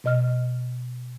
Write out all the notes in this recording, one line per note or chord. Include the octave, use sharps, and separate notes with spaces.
B2 D#5 F6